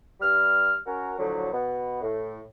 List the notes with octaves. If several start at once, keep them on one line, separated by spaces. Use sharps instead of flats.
G2 G3 F6
C#4 F#4 A#4
A2 D3 F3 F#3
B2 B3
A2